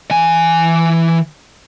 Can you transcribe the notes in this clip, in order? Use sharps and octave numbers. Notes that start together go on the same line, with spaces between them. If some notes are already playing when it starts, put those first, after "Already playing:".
E3 G#5